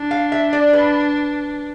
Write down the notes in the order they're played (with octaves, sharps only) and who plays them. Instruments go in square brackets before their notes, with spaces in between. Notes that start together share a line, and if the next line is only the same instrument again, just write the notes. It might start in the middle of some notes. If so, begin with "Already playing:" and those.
Already playing: [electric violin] D4
[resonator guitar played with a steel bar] F5
E5
D5
B4